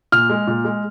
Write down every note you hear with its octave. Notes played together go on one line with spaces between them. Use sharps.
A#2 F6
G#3
A#2
G#3